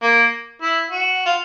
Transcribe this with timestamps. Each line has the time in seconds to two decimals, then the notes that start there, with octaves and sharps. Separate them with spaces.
0.03 A#3
0.62 E4
0.91 F#4
1.26 F4